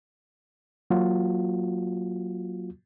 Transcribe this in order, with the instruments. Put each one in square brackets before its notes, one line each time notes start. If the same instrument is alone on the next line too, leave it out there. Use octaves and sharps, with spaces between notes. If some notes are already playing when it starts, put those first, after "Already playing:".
[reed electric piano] F#3 A#3 F4 F#4